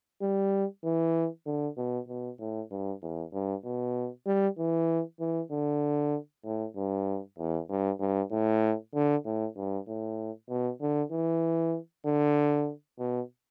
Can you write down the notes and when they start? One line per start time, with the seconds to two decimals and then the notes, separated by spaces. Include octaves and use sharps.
0.22 G3
0.84 E3
1.46 D3
1.77 B2
2.08 B2
2.39 A2
2.71 G2
3.02 E2
3.33 G2
3.64 B2
4.26 G3
4.58 E3
5.20 E3
5.51 D3
6.44 A2
6.76 G2
7.38 E2
7.69 G2
8.00 G2
8.31 A2
8.94 D3
9.25 A2
9.56 G2
9.87 A2
10.49 B2
10.81 D3
11.11 E3
12.06 D3
12.99 B2